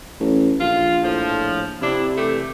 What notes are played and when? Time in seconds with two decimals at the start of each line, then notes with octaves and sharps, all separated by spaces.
0.20 A1
0.61 A#1 F4
1.03 A2 F3
1.82 C3 C4 D4 E4
2.18 E3 A3 G4